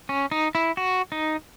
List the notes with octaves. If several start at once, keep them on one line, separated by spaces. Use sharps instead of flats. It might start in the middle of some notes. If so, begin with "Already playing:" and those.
C#4
D#4
E4
F#4
D#4